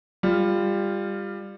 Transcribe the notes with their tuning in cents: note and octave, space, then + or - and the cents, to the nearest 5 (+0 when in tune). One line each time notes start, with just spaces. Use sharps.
G3 +20 F4 +0